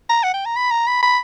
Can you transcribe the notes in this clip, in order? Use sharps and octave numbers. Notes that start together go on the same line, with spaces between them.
A#5
F#5
G5
A#5
B5
A#5
B5
B5